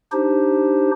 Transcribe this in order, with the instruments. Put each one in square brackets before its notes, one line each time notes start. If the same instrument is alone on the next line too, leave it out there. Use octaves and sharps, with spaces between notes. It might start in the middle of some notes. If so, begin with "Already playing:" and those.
[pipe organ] D4 D#4 G4 C5